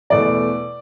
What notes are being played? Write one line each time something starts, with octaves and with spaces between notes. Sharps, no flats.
E2 B2 A3 D5